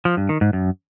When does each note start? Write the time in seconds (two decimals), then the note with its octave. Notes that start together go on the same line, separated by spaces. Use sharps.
0.05 F3
0.17 G2
0.29 D#3
0.41 G#2
0.53 F#2